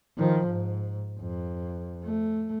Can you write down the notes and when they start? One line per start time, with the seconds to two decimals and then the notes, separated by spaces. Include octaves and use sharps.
0.17 D#3 F3
0.47 G#2
1.20 F2
2.04 A3